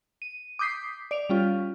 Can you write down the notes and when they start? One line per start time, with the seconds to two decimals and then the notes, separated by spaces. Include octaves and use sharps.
0.22 D#7
0.59 D6 D#6 G6 B6 C7
1.11 D5 D7 F7
1.29 G3 C#4 F4